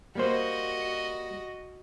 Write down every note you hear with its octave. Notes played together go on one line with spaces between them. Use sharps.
G3 A#3 F#4 C5 D#5